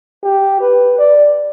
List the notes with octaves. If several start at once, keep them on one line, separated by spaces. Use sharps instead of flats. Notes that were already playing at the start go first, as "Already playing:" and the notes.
G4
B4
D5